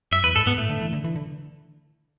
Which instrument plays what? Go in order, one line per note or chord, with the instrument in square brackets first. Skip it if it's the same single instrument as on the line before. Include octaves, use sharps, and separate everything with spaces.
[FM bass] F#2 [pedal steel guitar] E5
[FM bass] E2 [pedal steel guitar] B4
[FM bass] G#2 [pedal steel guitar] A4
[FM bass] G#2 [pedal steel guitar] B3
[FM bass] A2 [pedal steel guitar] A3
[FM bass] D3
E3
D3
E3
D3